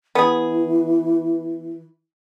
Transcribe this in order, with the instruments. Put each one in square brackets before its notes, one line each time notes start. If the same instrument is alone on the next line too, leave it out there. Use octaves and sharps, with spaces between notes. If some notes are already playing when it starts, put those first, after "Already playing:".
[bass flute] E3 [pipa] B3 G#4